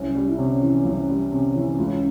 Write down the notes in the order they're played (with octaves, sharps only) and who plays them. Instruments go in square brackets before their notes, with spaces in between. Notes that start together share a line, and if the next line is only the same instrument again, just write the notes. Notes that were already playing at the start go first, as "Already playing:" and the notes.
Already playing: [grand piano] C2 [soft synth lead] C#4
[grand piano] G3
[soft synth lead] E4
[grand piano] C3 [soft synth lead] C#4
[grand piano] E3
C2
G3
C3
E3
C#2